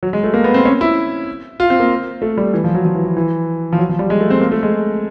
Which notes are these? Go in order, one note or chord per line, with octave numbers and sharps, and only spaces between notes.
F#3
G#3
A3
A#3
B3
C4
C#4
E4
F4
C4
A#3
A3
G3
E3
F3
F#3
F3
E3
E3
E3
F3
F#3
F3
G3
G#3
A3
C4
A#3
A3
G#3